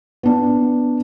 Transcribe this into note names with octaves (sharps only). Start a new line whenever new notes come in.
B3 D4